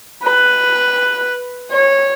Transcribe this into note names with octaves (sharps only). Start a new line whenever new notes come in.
B4
C#5